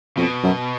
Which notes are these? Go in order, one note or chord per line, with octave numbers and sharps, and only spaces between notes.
F2 B2
F#2